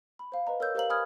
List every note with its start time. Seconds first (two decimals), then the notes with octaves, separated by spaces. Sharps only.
0.19 B5
0.32 C5 F5
0.47 B4 D#5 A#5
0.60 A#4 C#5 E6 G6
0.75 G4 A#4 C5 F5 A#5 F#7
0.90 G#5 B5 D#6 F6 G#6